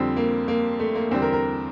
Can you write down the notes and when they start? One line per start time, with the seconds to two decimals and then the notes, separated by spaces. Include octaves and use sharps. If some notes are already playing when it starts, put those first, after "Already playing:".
Already playing: F2 D3 G3 C4
0.17 A#3
0.48 A#3
0.80 A3
0.95 A#3
1.11 E2 D3 G3 C4
1.22 A#4
1.33 A#4